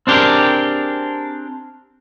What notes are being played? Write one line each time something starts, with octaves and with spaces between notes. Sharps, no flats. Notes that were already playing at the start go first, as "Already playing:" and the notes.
C4 D4 G4 G#4 A#4